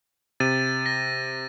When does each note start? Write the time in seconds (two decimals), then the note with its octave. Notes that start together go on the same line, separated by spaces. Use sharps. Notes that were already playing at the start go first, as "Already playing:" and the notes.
0.40 C3 A6 D#7
0.86 A#6